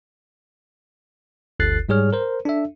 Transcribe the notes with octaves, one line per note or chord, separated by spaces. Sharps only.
G1 D2 A4 F#6 A6 C7
G#2 G3 G#4 C#5 F6
A#4 C5
D4 A4 E5